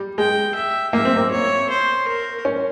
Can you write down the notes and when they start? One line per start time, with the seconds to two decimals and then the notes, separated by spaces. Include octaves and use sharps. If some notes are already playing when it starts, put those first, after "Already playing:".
Already playing: G3
0.18 G#3 G5
0.55 E5
0.93 A#3 E5
1.05 C4
1.17 A#3
1.31 C#5
1.70 C5
2.08 A#4
2.45 C#4